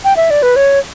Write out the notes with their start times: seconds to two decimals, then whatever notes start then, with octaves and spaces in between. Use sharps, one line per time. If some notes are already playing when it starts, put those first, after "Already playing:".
0.04 G5
0.16 E5
0.30 D5
0.43 B4
0.56 C#5